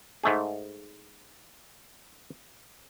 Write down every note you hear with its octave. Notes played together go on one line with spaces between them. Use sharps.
G#2 A3 G#4